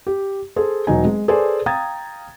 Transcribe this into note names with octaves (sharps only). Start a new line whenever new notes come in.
G4
G#4 A4 C5
E1 F#3 D#4 G#5
G#3
G#4 A4 B4 C5 D5 G#5
F5 G5 A#5 D#6 G#6 A6